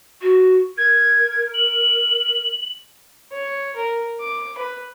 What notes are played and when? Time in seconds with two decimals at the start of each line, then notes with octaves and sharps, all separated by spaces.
0.21 F#4
0.78 A#4 G#6
1.54 F#7
3.32 C#5
3.77 A#4
4.21 D6
4.58 B4